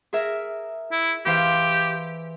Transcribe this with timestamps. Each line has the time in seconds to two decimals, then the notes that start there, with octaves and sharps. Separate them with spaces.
0.13 G#4 A#4 E5
0.92 E4
1.26 E3 G4 C5 F5